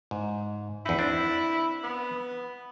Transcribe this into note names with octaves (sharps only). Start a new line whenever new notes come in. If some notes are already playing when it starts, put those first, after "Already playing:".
G#2
E2 D#4 E4
C4 D4
B3